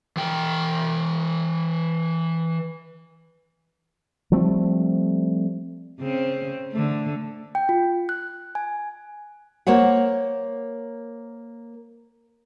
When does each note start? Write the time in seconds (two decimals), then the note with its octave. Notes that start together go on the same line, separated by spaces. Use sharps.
0.17 E3 G5
4.32 F3 G3 A3 C4
6.00 C#3 C4 C#4
6.72 D3 A3
7.55 G5
7.69 F4
8.09 F#6
8.55 G#5
9.67 A#3 C5 C#5 F#5